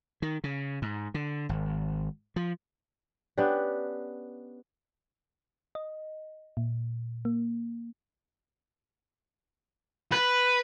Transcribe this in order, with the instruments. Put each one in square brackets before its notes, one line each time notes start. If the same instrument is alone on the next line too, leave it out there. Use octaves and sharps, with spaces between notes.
[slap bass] D#3
C#3
G#2
D3
G#1
F3
[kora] B3 C#4 D4 G4
[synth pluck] D#5
A#2
A#3
[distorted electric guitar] B4